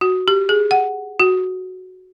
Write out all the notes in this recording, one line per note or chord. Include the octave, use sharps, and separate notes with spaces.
F#4
G4
G#4
F#5
F#4